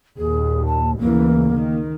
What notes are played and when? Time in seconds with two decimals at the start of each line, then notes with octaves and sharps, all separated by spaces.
0.17 D#2 A#2 G#4
0.66 A5
0.99 D2 C#3 E3 A#3
1.50 D#3